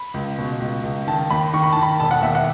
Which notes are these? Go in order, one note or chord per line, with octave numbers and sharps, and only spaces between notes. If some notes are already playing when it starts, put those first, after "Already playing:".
Already playing: B5
C#2
B2
C#2
C#2
D#3 A5
D#2 B5
D#3 C#6
B5
D#3 A5
B5
E1 A5
F#5
D#2 E5
F#5